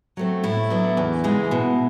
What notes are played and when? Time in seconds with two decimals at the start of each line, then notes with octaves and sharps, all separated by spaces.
0.17 F#3 A3 C4
0.44 A2 E4
0.70 F#3 B3 D4
0.97 E2
1.24 C#3 E3 G#3
1.51 B2